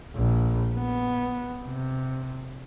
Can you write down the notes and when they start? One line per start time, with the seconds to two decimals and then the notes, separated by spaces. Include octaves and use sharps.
0.16 A#1
0.75 B3
1.65 C3